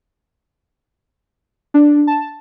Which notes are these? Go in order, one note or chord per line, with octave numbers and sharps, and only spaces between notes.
D4
A5